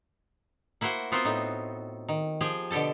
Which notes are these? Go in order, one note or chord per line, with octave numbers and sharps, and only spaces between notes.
A#3 E4 F#4 C5 F#5
B3 C4 F4 F#4 A#4 C5
A2 D#4
D#3
F3 G4 G#4
B2 D3 G4 A4 A5